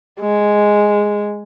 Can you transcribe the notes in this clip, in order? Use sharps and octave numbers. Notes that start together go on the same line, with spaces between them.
G#3